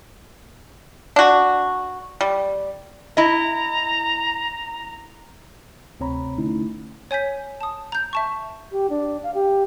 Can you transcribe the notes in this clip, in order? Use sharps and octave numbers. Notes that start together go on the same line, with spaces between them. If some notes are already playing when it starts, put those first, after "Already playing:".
D4 F#4
G3
E4 D#5 A#5
D2 C3 C4 C#5 A#5 B5
D3 A3 C#4 D#4 E4
C#5 G#5 G6 B6
A5 D#6
A#5 G6
E5 A5 C#6
G4
D4
F5
G4